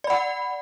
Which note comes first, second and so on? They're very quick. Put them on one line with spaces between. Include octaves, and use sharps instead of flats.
D5 B5 F#5